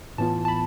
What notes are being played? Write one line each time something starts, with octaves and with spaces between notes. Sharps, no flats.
A2 E3 B3 F4 A5
A5
B5